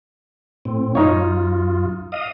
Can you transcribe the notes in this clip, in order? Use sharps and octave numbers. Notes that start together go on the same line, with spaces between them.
A2 C4
F#2 D#4 F4 C#5
D#5 F5 D#6